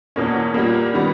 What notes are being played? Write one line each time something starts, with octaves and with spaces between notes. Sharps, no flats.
E2 B2 A#3 C#4
A#2 G3 A#3
D#3 G3 B3